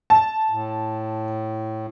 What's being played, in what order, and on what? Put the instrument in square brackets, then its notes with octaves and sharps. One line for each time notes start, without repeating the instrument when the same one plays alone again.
[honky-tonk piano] A5
[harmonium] A2